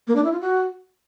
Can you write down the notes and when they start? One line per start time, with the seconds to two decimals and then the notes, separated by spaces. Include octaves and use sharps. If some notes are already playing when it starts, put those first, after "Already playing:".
0.07 A#3
0.16 D4
0.24 E4
0.32 F4
0.41 F#4